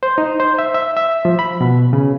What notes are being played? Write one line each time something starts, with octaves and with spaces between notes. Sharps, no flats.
C5
D#4
C5
E5
E5
E5
F3
B5
B2
C#3